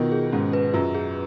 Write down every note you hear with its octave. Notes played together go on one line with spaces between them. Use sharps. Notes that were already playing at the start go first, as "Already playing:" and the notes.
Already playing: B2 D#3 F4
G#4
G#2 C#4
B4
F#2 F4
G#4